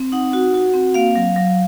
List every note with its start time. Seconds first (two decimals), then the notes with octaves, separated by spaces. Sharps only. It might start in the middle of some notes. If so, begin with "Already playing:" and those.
Already playing: C4
0.12 D#4 F#5
0.33 F#4
0.54 F#4
0.74 C4
0.94 A#3 F5
1.16 F#3
1.36 F#3